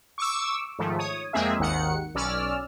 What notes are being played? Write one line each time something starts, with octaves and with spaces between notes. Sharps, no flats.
C#6 D6 E6
G#2 D#3 F3 A3
C#5 D#6
F2 G#3 A#3 C4 G#4 E5
G#1 D#2 D#3 F#5 C#7
B1 C#4 D5 E6 F6